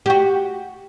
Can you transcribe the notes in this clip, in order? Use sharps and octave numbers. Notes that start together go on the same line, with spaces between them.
F#4 G4